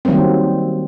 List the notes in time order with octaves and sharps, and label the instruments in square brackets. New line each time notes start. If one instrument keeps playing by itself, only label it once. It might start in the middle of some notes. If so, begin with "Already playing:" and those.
[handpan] D#3 F#3 G3 A#3 C4